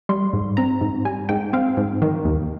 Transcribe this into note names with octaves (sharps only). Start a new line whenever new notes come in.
G3 C6
G#2
C4 A#5
G#2
G3 G#5
G#2 G5
C4 F5
G#2
D#3
D#2